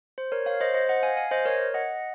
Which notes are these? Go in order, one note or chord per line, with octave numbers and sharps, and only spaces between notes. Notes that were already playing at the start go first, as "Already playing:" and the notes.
C5
A#4 C#5
C#5 F5
C5 D#5
C5 D#5
D#5 F#5
F5 G#5
F5 G#5
C5 D#5
A#4 C#5
D#5 F#5